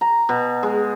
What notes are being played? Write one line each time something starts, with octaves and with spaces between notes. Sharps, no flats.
A#5
B2
G#3